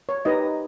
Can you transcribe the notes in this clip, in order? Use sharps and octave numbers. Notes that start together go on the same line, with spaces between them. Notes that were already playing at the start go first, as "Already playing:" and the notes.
C#5
D#4 G4 B4 D#5